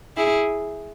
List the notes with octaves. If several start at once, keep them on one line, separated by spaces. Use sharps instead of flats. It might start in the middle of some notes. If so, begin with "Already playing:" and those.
E4 G#4